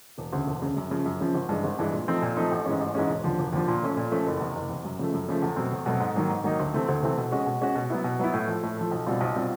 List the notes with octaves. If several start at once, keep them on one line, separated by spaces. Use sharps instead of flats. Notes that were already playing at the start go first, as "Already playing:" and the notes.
E1
D2 C#3
E1
D2 C#3
F#2
C#3 F3
F#2
C#3 F3
G#1
G2 E3 G#3
G#1
G2 E3 G#3
A#2
F3 A3 C4 D#4
A#2
F3 A3 C4 D#4
A1
G#2 E3 G#3 C#4
A1
G#2 E3 G#3 C#4
E1
D#2 D3 F3
E1
D#2 D3 F3
A#2
F3 A3 C#4
A#2
F3 A3 C#4
F#1
E2 C3
F#1
E2 C3
F#2
C#3 F3 A3
F#2
C#3 F3 A3
E2
B2 F#3 A3 C4
E2
B2 F#3 A3 C4
G#2
D#3 F#3 A#3 D#4
G#2
D#3 F#3 A#3 D#4
D2
C3 E3 A3 C4
D2
C3 E3 A3 C4
B2
G#3 C#4 F#4
B2
G#3 C#4 F#4
B2
F#3 B3 E4
B2
F#3 B3 E4
A2
F3 A3
A2
F3 A3
B1
B2 G3 C4 F4
B1
B2 G3 C4 F4